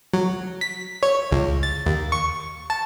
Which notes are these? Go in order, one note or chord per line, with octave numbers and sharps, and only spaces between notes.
F#3
B6
C#5
C#2
A6
D#2
C#6
A5